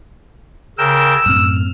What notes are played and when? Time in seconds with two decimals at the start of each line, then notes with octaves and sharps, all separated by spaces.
0.78 C#3 A#4 G5 E6
1.26 F#2 A2 C4 F6